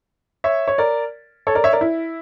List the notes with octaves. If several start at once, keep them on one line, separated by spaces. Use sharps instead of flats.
C#5 E5
C#5
A#4 D5
A4 C#5
A#4 D5
C#5 E5
A#4 D5
E4